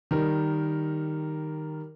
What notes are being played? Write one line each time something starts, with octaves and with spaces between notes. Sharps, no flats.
D#3 G3 A#4